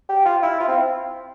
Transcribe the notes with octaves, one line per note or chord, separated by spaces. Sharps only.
G4
F4
E4
F4
C4